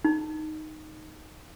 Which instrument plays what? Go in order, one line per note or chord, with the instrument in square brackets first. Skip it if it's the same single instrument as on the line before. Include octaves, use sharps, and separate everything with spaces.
[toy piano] D#4